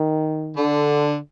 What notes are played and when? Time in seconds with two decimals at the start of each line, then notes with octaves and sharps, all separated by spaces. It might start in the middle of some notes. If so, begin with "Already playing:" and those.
Already playing: D#3
0.56 D3